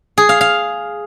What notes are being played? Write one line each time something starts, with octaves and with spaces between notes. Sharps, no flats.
G#4
F5
F5